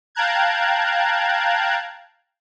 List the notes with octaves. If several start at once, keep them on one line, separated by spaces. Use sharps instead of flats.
F5 G5 A5 A#5 F#6 G#6